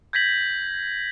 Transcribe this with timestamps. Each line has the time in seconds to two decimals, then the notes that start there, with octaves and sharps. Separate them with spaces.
0.13 G6 G#6 A#6 B6 F#7